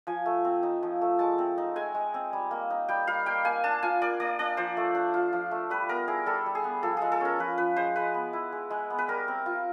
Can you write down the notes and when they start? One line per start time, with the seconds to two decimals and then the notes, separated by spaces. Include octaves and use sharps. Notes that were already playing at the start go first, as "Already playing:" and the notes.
0.07 F3 G#5
0.26 A3
0.45 C4
0.63 D#4
0.83 F3
1.01 A3
1.19 G#3 A5
1.38 C4
1.58 D#4
1.76 G#3 G#5
1.94 G#3
2.14 C4
2.33 G3
2.51 A#3
2.70 D#4
2.89 G3 G5
3.07 G3 F5
3.26 A#3 G5
3.45 A#3 G#5
3.64 D4 A5
3.83 F4 G#5
4.01 A#3 D5
4.20 A#3 D5
4.39 D4 D5
4.57 F3 C5
4.77 A3
4.95 D4
5.14 F4
5.33 F3
5.51 A3
5.70 G3 B4
5.89 B3 A#4
6.08 E4 G#4
6.26 G3 A4
6.46 G3
6.55 G#4
6.64 B3
6.83 F3 A4
6.97 G#3 G#4
7.12 A4
7.21 C#4 A#4
7.39 F3 B4
7.58 F3 B4
7.76 G#3 C5
7.95 G#3 B4
8.14 B3
8.33 E4
8.52 G#3
8.70 G#3
8.90 B3
8.98 B4
9.08 G3 A#4
9.28 C4
9.46 F4